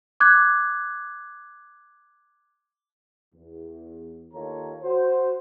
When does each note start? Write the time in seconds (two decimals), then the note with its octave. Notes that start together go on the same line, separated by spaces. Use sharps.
0.20 D6 F#6 G#6
3.35 E2
4.34 D#2 D#3 F4 A4 C#5 A#5
4.84 F#4 C5